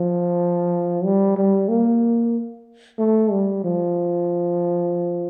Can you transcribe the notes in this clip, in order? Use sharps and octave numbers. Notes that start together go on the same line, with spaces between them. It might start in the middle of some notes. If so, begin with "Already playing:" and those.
Already playing: F3
G3
G3
A#3
A3
G3
F3